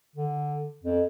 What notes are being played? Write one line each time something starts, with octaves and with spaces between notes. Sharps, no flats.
D3
F2